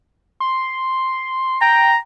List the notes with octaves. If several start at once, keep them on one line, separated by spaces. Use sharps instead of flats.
C6
G5 A#5